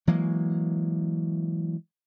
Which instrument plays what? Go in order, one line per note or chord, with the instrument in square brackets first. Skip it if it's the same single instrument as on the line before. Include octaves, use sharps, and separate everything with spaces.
[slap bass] E3 F#3 G#3 A#3